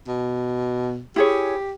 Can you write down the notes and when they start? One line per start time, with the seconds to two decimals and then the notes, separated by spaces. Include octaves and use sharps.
0.08 B2
1.16 E4 G4 G#4 C#5